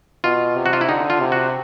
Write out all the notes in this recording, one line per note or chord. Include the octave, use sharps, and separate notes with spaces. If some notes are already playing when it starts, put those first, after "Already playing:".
B2 F4
C3
F#4
F4
E4
D3 D#4
F4
C3
F#4